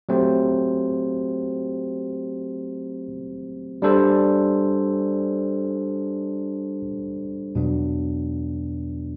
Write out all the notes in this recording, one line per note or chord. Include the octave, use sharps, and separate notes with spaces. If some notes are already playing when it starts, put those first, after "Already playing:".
F#3 A3 C4 G4 C5
G3 D4 A4 C5
E2 B2 F#3 B3 D4